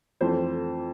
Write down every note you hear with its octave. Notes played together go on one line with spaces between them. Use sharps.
F2 E3 A3 C5